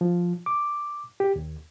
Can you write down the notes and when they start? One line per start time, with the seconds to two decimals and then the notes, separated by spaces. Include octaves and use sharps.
0.01 F3
0.46 D6
1.20 G4
1.36 D#2